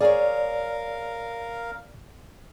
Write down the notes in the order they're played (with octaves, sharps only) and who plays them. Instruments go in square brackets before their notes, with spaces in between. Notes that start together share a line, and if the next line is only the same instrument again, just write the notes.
[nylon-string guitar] G#4 C#5 [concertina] A#4 F5 [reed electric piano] D5